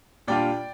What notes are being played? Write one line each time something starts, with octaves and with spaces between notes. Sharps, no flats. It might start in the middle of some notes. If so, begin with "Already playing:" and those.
A#2 G3 D4 F4 D5 G5